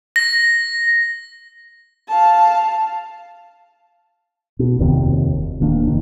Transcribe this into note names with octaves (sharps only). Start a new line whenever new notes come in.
A#6
F5 A5
B2
F1 D#2 C3 D#3
D#1 D#3 A#3 D4
F1 D#3